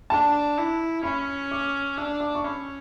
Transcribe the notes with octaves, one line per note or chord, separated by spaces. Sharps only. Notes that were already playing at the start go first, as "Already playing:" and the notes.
D4 A5
E4
C#4 B5
D6
D4 E6
D6
C#6
C#4 B5